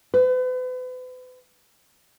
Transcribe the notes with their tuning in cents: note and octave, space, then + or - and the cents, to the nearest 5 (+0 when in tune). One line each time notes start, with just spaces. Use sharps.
B4 +40